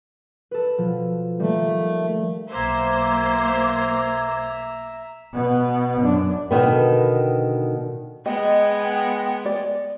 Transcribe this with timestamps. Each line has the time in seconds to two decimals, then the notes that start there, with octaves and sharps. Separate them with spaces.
0.51 A4 B4
0.78 B2 F3
1.39 D#3 G3 A3 A#3
2.50 B1 A#3 C5 E5 A#5 D6 G#6
5.34 B2 B3
6.02 F#2 D4
6.51 B2 D3 D#3 B3
8.26 G#3 B3 D#5 G5
9.46 D5